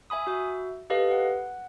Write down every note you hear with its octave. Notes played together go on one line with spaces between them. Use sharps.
E5 G#5 B5 D#6
F#4 E5
G4 A4 B4 D#5 F5
F#5